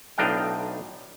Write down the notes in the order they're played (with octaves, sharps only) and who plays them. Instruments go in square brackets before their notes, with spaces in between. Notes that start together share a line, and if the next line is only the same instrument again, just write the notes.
[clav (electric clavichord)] B1 A2 D4 D#4 F5 G5